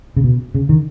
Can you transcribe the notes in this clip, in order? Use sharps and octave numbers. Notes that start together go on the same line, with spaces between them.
C#3
B2
C#3
D#3